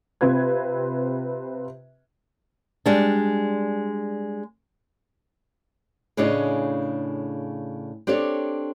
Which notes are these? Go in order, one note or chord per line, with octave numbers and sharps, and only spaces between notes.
C3 C4 F4 B4 G#6
G3 G#3 D4
A2 C#3 D4 G#4 C#5 D#5
C4 D4 G4 A4 C#5